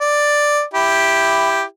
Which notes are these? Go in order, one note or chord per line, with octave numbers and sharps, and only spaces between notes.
D5
E4 G4